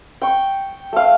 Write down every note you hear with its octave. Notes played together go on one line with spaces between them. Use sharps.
G5 C#6
A3 F5